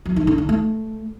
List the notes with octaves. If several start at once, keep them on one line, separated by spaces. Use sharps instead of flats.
F#3
D#3
D3
D4
A3